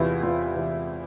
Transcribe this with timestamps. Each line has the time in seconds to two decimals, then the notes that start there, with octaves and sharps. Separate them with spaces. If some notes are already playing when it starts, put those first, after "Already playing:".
Already playing: E2 C3 E3 E4 F4
0.23 E2 F4
0.56 C3 E3